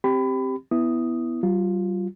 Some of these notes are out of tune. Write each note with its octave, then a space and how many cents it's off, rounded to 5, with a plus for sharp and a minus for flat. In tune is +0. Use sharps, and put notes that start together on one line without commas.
C4 +10 G4 +0 B5 +25
B3 +0 E4 +0 D#6 +0
G3 -40 F4 +0